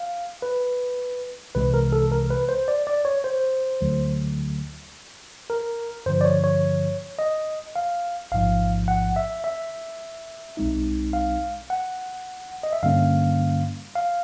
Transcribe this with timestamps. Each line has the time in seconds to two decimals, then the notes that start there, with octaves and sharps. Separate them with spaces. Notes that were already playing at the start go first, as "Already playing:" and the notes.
Already playing: F5
0.42 B4
1.55 C2 C3 E3 G#3 B4
1.74 A#4
1.92 A4
2.12 A#4
2.31 B4
2.49 C5
2.68 D5
2.87 D5
3.05 C#5
3.24 C5
3.81 D2 D3 F#3 A3
5.50 A#4
6.06 G2 D3 F3 C5
6.21 D5
6.25 C#5
6.44 C#5
7.19 D#5
7.76 F5
8.32 A1 G#2 F3 F5
8.88 F#5
9.16 E5
9.44 E5
10.57 B1 B2 G#3 C4 D#4
11.13 F5
11.70 F#5
12.63 D#5
12.73 E5
12.83 G2 D3 G3 A#3 C#4 F5
13.95 F5